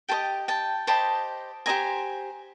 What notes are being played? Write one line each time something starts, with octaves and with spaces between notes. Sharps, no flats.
G4 C5 D#5 G5 A5
G5 A5
G4 C5 D#5 A5 B5
G4 C5 D#5 G#5 A#5